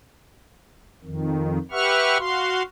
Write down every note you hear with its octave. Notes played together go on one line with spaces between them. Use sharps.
F2 D#3
G4 B4 E5 F#5 C#6 F6
F#4 F5 C6